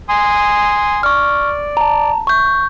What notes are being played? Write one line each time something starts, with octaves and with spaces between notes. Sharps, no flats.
G#5 C6 D#6
D5 C#6 F6
A5 A#5
C#6 G6